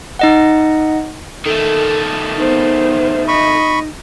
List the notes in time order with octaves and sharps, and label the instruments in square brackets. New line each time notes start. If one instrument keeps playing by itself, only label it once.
[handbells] D#4 D#5 F#5
[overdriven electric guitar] D#3 A3 [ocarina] A4
[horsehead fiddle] B3 C5 [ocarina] D#4
[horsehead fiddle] D#5 [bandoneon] B5 C#6